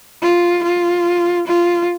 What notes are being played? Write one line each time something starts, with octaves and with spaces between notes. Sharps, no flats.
F4
F4
F4